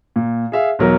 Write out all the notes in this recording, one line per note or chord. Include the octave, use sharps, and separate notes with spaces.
A#2
G#4 E5 F5
B1 E2 F#3 A#4